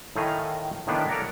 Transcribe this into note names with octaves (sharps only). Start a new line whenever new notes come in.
A2 D#3 A3 F5 G#5 A#5
A2 D#3 A#3 B3 D4
A4 A#4 C#5 D5 F#5 A#5